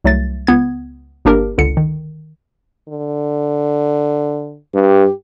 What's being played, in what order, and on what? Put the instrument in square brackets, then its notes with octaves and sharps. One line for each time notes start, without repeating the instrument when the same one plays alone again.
[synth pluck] C2 F#3 A3 A6
C#2 B3 G#6
G1 A#3 D4 G4 A#4
G1 C#2 D3 C#7
D#3
[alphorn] D3
[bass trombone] G2 [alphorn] G4